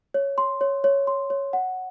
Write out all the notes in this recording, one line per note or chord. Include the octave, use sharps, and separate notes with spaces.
C#5
C6
C#5
C#5
C6
C#5
F#5